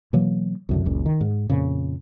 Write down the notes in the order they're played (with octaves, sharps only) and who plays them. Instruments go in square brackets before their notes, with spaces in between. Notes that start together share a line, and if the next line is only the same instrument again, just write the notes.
[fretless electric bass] B2 E3 F#3 A#3
C2 F#2 D3
F#1 C#2 A#2
D#3
G#2
F2 A#2 C#3